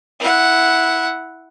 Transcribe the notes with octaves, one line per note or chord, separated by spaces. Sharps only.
E4 F#5